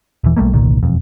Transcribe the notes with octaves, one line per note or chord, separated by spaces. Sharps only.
D#1 E3
B1 G3 A3 A#3
G1 C2 A#2 D#3
E1 F2